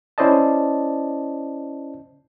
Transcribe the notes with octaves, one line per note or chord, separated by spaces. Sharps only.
C#4 E4 C5 D5 D#5 A5